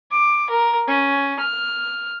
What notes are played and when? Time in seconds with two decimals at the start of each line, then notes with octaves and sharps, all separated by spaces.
0.12 D6
0.50 A#4
0.88 C#4
1.39 F6